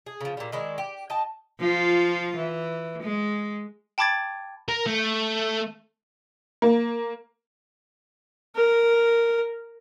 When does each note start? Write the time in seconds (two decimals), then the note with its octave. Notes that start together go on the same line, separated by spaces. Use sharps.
0.06 G#4
0.21 C#3 F3
0.37 A#2 G3
0.52 D#3 G#3 E4 D5
0.78 G4
1.10 D#5 G5 A5
1.60 F3 F4
2.37 E3
3.02 G#3
3.98 G5 A5 B5 D6 G#6 A6
4.68 A#4
4.86 A3
6.62 A#3
8.56 A#4